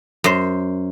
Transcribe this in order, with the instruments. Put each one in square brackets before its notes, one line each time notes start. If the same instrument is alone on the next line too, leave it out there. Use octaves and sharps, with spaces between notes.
[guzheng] F#2 C5